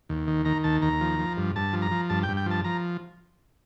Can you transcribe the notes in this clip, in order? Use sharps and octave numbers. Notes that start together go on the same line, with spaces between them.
D#2
D#3
D#3 A#5
D#2 A5
D#2 A#5
F3
F3
G2
G2 A5
F3
A#5
F3
G2 A5
G5
G2
G5
F3 A5
F3 A#5